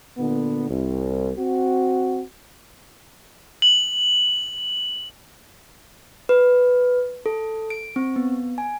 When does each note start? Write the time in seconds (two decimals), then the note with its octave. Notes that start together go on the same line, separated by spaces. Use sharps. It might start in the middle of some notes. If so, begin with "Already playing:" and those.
0.18 A#2 D3 B3
0.70 C2
1.38 C4 F#4
3.62 F#7
6.29 B4
7.26 A4
7.70 D7
7.96 C4
8.16 B3
8.58 G#5